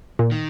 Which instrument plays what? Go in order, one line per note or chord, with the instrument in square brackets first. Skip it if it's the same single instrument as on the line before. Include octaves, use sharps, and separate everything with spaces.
[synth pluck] A#2
[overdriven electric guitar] D#3